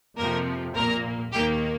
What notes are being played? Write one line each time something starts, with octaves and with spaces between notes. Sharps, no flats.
F2 C3 F3 A#3 A#4
A#1 A#2 A#3 A#4 A#5
D#2 D#3 A#3 G4 G5